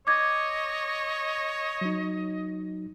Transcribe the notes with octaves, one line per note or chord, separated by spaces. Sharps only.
C#5 D#5 D6 G#6
F#3 D#4